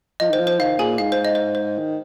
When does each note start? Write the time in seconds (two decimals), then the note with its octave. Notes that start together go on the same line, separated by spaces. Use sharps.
0.20 F3 D#5
0.30 D#3 C5
0.40 F3
0.47 C5
0.59 D#3 F5
0.79 A#2 G#4 G#5
0.98 G#2 F5
1.12 C5
1.25 D#5
1.35 C5
1.55 C5
1.78 D#3